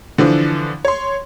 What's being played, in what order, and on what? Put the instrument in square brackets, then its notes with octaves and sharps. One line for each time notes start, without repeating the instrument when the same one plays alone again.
[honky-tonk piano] D3 E3 F3 D4
C#5 C6